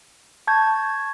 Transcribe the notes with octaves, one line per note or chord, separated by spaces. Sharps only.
A5 C#6 G6 G#6